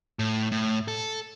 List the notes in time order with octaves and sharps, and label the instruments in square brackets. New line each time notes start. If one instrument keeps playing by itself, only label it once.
[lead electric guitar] A2
A2
A4